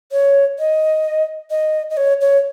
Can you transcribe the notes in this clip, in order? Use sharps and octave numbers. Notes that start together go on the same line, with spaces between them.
C#5
D#5
D#5
D#5
C#5
C#5